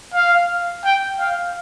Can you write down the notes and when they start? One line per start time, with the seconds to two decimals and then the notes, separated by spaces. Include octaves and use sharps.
0.14 F5
0.85 G5
1.19 F5